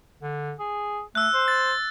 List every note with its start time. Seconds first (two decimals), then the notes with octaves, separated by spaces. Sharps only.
0.22 D3
0.60 G#4
1.15 A3 E6 F#6
1.34 C5
1.48 A6